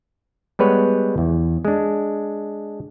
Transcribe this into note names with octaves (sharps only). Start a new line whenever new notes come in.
G3 G#3 B3 B4 C#5
E2
G#3 D4